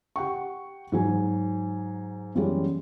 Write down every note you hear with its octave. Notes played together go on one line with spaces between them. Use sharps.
G4 F#5 G5 C#6
G#2 F#3 G#5
F#2 E3 G3 G#3 C#4